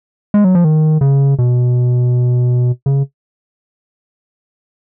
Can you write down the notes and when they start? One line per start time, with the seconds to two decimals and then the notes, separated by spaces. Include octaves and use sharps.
0.34 G#3
0.44 F#3
0.55 F3
0.64 D#3
1.01 C#3
1.39 B2
2.86 C#3